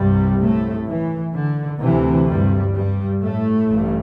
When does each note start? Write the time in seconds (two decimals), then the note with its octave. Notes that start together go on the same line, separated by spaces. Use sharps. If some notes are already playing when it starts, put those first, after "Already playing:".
Already playing: C2 G2 C3 G3
0.40 A2 A3
0.87 E3
1.33 D3
1.81 D2 C3 E3
2.28 G2 G3
2.74 G2 G3
3.21 A2 A3
3.69 A1 G2